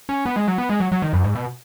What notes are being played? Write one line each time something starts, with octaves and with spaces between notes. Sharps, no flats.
C#4
B3
G#3
F#3
B3
G#3
F#3
F#3
D#3
F#2
G#2
B2